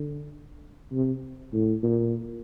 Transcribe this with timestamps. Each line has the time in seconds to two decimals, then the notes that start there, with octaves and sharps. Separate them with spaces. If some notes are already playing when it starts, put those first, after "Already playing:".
Already playing: D3
0.92 C3
1.52 A2
1.82 A#2